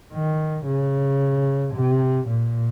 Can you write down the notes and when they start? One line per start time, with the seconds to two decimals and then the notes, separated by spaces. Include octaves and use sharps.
0.13 D#3
0.66 C#3
1.74 C3
2.28 A#2